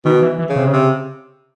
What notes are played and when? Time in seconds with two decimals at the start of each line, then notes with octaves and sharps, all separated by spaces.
0.05 B2 D#3
0.22 E3
0.38 E3
0.49 C#3
0.56 C3
0.67 C#3
0.73 C3